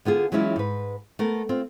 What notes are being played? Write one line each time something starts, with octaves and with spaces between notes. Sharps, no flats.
D3 B3 F4 G#4
E3 F#3 G#3 C#4 E4 F4
G#2 B4
A3 B3 A#4
C4 F4